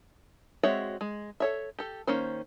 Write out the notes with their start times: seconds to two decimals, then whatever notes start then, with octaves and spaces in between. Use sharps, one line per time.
0.63 G#3 C4 F#4 C#5 E5
1.01 G#3
1.40 A4 C#5 E5
1.79 G4 A4
2.07 D#3 A#3 C#4 C5